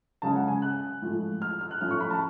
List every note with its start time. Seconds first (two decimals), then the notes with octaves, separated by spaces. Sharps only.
0.22 C#3 G#3 C#4 A5
0.36 F#5
0.48 G#5
0.62 F#6
1.02 A2 F3 G#3
1.42 F6
1.61 F6
1.71 F#6
1.81 A2 F3 A3 C#4 F6
1.91 C#6
2.00 B5
2.10 A5